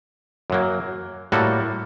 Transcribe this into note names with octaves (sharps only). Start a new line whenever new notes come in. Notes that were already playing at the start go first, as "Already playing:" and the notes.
F#2 F#3 A#3
A2 G3 A#3 F#4 A4